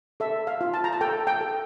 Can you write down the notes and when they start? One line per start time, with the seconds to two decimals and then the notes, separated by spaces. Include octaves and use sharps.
0.20 A4 E5
0.47 F5
0.61 F4
0.74 A5
0.84 A#5
0.93 A5
1.01 A4 G5
1.27 G5
1.41 A4